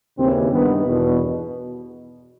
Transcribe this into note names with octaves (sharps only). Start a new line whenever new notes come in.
D#2 C#3 E3 C4
G2 D#3 B3
E2 B2